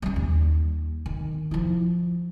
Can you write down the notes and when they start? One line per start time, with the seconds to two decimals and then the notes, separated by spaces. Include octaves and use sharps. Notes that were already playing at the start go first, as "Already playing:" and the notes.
0.02 G3 C#4
0.16 D#2
1.06 D#3
1.51 F3 E4